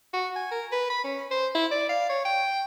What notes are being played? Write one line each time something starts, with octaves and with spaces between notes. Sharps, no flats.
F#4
G#5
A#4
B4
B5
C#4
C5
E4
D5
F5
C#5
G5